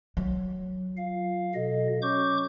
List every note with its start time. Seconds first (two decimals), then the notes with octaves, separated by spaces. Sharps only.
0.17 F#3
0.97 F4 F5
1.55 B2 A4 D#5
2.02 C#4 C#6 D6 G6